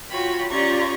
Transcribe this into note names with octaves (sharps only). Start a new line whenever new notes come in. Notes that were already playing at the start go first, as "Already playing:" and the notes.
F4 F#4 C#5 G5 B5
C#4 F4 G4 D5 A#5 C#6